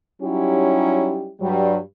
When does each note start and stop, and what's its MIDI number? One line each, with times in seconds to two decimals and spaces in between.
0.22 1.31 54
0.22 1.31 55
0.22 1.31 61
0.22 1.31 63
0.22 1.31 64
0.22 1.31 67
1.41 1.78 43
1.41 1.78 54
1.41 1.78 55